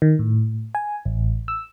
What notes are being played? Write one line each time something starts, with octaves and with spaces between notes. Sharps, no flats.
D#3
A2
G#5
A1
E6